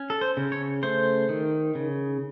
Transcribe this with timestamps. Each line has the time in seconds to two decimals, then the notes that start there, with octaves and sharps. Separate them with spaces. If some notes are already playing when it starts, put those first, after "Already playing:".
Already playing: C#4
0.10 A4
0.21 C5
0.37 C#3
0.52 C#5
0.83 A3 C5
1.29 D#3
1.75 C#3